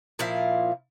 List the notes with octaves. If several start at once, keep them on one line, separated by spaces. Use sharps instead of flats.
A#2 F3 E4 F5